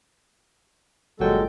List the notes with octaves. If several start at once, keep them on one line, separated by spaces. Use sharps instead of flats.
G1 A#2 F#3 G#3 A4 G5